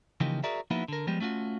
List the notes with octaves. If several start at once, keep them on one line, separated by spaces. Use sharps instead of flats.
C#3 E3 F3 A#3 D#4 G4
F#4 G#4 A#4 D5 E5
F3 A#3 B3 D#4 E4 F#4
D3 A#4
F3 G3 G#3 B3 G4
A3 C#4 F4 F#4